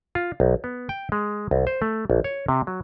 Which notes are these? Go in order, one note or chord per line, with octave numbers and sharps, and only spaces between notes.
F4
B1
B3
G5
G#3
C2
C5
A3
A#1
C#5
C3
F#3